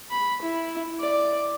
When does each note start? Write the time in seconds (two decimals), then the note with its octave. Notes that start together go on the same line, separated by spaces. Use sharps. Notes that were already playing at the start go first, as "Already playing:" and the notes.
0.10 B5
0.41 E4
0.99 D5